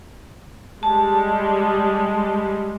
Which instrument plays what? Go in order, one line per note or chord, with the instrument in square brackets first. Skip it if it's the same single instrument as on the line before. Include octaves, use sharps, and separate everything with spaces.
[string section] G3 G#3 [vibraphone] A5